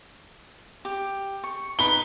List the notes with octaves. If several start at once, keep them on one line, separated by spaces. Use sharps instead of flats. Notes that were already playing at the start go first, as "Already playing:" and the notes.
G4
C#6
D#4 B4 B5 G7